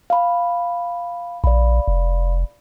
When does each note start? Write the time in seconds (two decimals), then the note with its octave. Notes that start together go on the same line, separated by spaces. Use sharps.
0.10 F5 B5
1.44 A#1 D5 F5 B5
1.88 F1